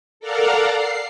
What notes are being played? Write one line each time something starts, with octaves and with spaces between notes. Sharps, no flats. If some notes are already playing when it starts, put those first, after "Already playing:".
A4 A#4 D5 F5 F#5 A#5
C7